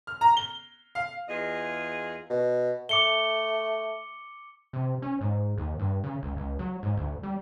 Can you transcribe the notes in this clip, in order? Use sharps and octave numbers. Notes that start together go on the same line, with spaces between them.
F6
A#5
G7
F5
E2 F4 G#4 D#5
B2
A3 D6 C#7 G7
C3
C#4
G#2
D#2
G2
C#3
C#2
C#2
F#3
G#2
D2
G3